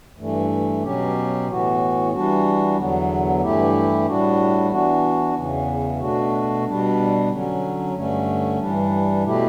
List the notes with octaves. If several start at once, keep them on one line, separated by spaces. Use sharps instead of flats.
G2 E3 A3
B2 F#3 C#4 G4
A2 E3 B3 F#4
E3 G3 D4 F#4
E2 D3 F#3 B3
G2 E3 A3 E4 G4
A2 G3 D4 F#4
E3 B3 D4 F#4
E2 C#3 E3
B2 A3 D4 F#4
B2 G3 D4
D3 F#3 C#4
G2 D3 A3 C#4
G2 E3 G3 D4
B2 A3 E4 G4